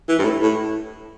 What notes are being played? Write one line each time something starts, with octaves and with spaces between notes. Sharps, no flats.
E3
G2
A2
A2